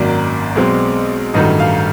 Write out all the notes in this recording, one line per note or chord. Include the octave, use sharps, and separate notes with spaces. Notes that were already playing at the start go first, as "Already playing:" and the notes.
Already playing: G#1 F#2 D#3 F#3 A#3 D5
B1 B2 G#3 C4
A1 G2 D#3 F#3 A3 D#5
F5